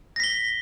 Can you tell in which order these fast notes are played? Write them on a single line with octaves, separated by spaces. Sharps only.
A#6 B6 G7